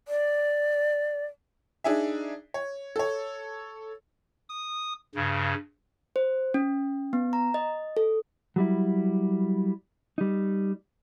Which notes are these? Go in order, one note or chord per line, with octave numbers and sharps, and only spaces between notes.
D5
D4 D#4 G#4 E5
C#5
A4 C#5
D#6
G2 C#3
C5
C#4
B3
A#5
D#5
A4
F#3 G3 E4
G3 D#4